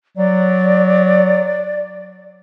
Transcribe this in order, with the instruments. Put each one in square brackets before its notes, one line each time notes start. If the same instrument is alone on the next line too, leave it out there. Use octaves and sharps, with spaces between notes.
[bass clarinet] F#3 [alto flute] D5